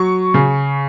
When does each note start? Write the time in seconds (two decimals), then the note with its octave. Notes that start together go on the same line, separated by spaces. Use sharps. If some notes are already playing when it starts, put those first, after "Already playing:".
Already playing: F#3 C#6
0.34 C#3